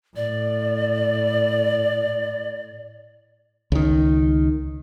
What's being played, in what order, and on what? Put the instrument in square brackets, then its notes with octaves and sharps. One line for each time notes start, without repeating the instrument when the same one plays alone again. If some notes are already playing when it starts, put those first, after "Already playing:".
[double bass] A2 [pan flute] D5
[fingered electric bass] C#2 D#3